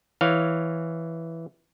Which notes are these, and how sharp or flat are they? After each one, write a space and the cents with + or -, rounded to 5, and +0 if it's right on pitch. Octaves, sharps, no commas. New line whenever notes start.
E3 +0 C#5 +0 F5 +0